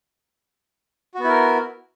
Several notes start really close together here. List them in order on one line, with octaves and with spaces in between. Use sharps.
F#4 B3 E4 A#4